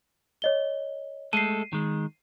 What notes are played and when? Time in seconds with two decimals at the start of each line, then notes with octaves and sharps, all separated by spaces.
0.42 C#5 D#5 G7
1.33 G#3 A3 A4 C7 D#7
1.73 D#3 G#3